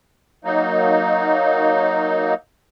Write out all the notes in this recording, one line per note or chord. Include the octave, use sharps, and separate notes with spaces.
F#3 A#3 D#4